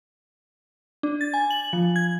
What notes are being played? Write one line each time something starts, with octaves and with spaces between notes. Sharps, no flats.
D4
A6
G#5
F#7
F3
G#6